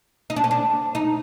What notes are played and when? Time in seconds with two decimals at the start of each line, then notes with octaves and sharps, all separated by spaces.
0.30 D#4
0.36 D4
0.44 C#4
0.51 D4
0.95 D#4